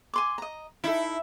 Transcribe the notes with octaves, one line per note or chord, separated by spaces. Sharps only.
G#5 C6 D6
D#5 A#5
D#4 E4 A4